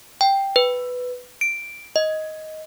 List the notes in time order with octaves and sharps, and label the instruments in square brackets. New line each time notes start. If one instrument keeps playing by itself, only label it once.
[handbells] G5
B4
D7
D#5